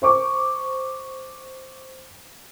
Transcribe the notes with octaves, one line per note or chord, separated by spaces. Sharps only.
C5 C#6 D6